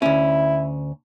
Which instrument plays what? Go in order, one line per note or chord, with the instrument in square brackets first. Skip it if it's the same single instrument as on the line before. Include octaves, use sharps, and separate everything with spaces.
[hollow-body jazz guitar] D2 C#4 [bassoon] E4